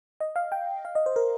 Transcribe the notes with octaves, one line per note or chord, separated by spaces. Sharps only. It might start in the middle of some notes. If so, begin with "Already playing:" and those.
D#5
F5
G5
F5
D#5
C5
A#4